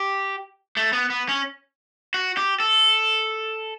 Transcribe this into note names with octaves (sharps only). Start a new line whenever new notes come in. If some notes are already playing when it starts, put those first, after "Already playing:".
Already playing: G4
A3
B3
B3
C#4
F#4
G4
A4